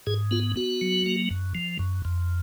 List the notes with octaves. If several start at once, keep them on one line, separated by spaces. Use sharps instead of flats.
G#2 G#4
B3 F4
B3 F#4
F#3
A#3
F#2
F3
F#2
F2